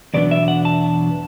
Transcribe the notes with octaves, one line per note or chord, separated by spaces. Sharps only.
E2 B2 F#3 B3 D4 D5
E5
F#5
A5